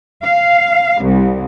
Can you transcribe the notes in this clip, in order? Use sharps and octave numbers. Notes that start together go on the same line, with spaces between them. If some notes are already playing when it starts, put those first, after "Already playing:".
F5
C2